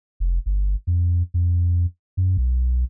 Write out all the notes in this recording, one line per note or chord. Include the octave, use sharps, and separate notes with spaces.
F1
G1
F2
F2
F#2
B1